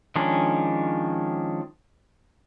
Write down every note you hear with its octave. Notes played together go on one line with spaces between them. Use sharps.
D#3 F3 G#3 C#4 D4